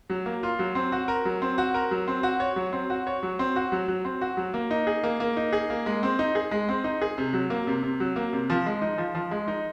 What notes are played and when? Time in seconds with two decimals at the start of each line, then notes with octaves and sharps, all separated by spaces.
0.10 F#3
0.26 A#3
0.43 F4
0.59 F#3
0.75 C4
0.92 F#4
1.08 A#4
1.25 F#3
1.42 C4
1.58 F#4
1.74 A#4
1.91 F#3
2.08 C4
2.23 F#4
2.40 C#5
2.56 F#3
2.73 C4
2.90 F#4
3.07 C#5
3.23 F#3
3.39 C4
3.56 F#4
3.72 F#3
3.88 F#3
4.05 C4
4.21 F#4
4.37 F#3
4.54 A#3
4.71 D#4
4.87 G#4
5.03 A#3
5.20 A#3
5.37 D#4
5.53 G#4
5.70 A#3
5.86 G#3
6.03 C4
6.19 D#4
6.35 G#4
6.51 G#3
6.69 C4
6.84 D#4
7.02 G#4
7.18 C3
7.33 F#3
7.50 A#3
7.67 C3
7.83 C3
8.00 F#3
8.16 A#3
8.33 C3
8.50 F3
8.66 G#3
8.82 D#4
8.98 F3
9.15 F3
9.31 G#3
9.48 D#4